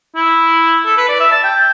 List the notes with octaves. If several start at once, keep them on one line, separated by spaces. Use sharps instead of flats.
E4
A4
B4
D5
E5
A5
G5